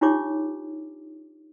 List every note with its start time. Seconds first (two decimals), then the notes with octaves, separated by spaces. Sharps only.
0.01 D4 D#4 F4 G4 C#5 D6